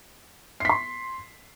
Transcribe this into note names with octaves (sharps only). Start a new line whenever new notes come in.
C6 B6 C7